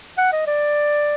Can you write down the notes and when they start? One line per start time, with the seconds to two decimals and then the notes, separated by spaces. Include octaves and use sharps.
0.18 F#5
0.32 D#5
0.47 D5